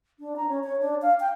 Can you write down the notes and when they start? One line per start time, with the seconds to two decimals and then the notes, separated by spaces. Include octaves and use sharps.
0.20 D4
0.36 A#5
0.49 C#4
0.64 C#5
0.81 D4
1.02 F5
1.20 G5